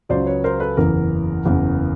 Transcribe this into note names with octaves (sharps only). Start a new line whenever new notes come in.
C#2 C#3 F#3 C5 D5
B4 C#5
A#4 C5
A4 B4
F#1 E2 C#3 E3 A#4
F#1 E2 C#3 E3